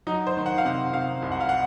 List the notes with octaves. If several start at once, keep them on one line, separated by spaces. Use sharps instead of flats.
F#3 D#4
C5
D#3
F#5
F5
C3 F#5
C3 F5
C2
F#5
F5
F#5